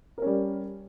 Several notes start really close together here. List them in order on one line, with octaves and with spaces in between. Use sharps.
A#4 C#4 G3